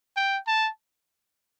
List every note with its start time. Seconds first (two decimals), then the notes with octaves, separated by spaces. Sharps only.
0.16 G5
0.47 A5